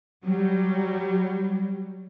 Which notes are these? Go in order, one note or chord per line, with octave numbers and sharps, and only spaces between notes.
F#3 G3